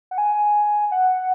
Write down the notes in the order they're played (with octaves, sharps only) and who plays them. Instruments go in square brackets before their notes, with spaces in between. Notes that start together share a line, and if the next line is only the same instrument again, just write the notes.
[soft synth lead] F#5
G#5
F#5